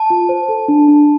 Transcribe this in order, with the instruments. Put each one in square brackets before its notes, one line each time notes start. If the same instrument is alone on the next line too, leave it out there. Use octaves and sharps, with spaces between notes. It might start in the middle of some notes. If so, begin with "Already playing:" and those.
Already playing: [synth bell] A5
[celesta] F4
C5
A4
D4
D4